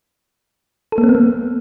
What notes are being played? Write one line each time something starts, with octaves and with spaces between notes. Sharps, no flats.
A4
A#3
C4
B3
A#3